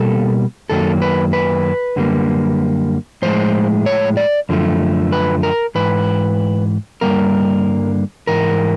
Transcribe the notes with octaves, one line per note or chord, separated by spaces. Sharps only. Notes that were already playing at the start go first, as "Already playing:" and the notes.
Already playing: B2 G3 A#3 A4
F#2 D#3 F#3 A#3 A4
B4
B4
F#2 D3 G3 A#3
A2 F3 G#3 C5
C#5
D5
F#2 D3 F3 A3
B4
A#4
G#2 E3 B4
G2 D3 G3 A#3 A#4
G#2 E3 A#4